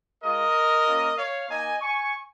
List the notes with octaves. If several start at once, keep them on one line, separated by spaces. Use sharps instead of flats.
G#3 F4 A#4 D#5
A#3 C#4 F4
C#5 F5
A#3 D#4 D#5 G#5
G#5 C#6